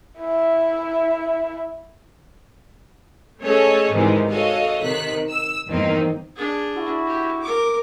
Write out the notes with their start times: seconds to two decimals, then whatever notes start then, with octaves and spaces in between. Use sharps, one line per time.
0.18 E4 E5
3.41 A3 C#4 G#4 A4 C#5 D#5
3.92 G#2 C3 D#3 E3 G3 G#3
4.28 F#4 A4 C#5 D#5 F5
4.82 C3 D#3 F#6 B6
5.30 E6
5.68 E2 G2 D#3 A#3 C4 D#4
6.36 D4 G#4
6.76 E4 F#4
7.07 G4
7.42 A#4 D6